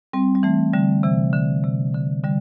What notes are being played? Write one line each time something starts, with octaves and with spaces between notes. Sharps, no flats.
G3 C4
G3
E3 A3
D3 G3
C3 E3
D3
C3
D3
D3 G3